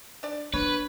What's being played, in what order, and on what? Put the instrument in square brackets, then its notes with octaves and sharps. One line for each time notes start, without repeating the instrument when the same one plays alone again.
[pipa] D4 D5
[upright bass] D4 [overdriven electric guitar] B4 [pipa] C#5